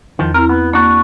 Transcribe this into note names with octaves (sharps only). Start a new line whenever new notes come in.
E2 D#3 F3
C4 E4 A#4
B3
A#3 D4 F#4